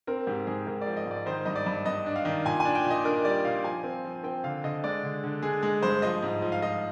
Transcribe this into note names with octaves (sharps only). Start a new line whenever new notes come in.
C4 A#4
G#2 G4
G#2 G#4
G#2 A#4
D5
F3
D#5
G#2 D5
D#3 C5
G2 D#5
D5
G2
G2 D#5
D4
F5
D#3
A#2 G#5
G#5
D4
G5
A#2
D#5
D4 A#4
G3 D5
A#2 F5
F3 G#5
C4
F3
C4 G5
D3 F5
D3 D#5
G#3 D5
D3
D3
G#3 G#4
G#3 G#4
G2 C5
F3 D#5
G#2
F3
F5
F3 D#5